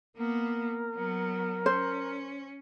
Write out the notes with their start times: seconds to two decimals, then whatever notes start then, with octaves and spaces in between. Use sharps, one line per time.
0.17 A#3 B3 A#4
0.94 F#3 B3
1.66 C#4 C5